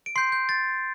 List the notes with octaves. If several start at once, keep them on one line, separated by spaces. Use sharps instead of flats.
D7
C6 G6 C7
G6
A6